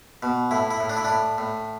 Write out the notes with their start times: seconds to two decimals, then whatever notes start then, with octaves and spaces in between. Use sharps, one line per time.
0.23 B2
0.51 A2 E4
0.71 E4
0.80 A2
0.90 D4
0.97 E4
1.05 A2 D4
1.38 A2